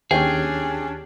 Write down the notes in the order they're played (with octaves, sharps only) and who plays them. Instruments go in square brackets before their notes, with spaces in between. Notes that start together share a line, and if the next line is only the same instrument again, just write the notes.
[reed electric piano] D#2 G4 C#5 [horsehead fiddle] C#4 D4 [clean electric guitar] G#4 [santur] G5